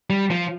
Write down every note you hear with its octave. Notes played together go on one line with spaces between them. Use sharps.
G3
F3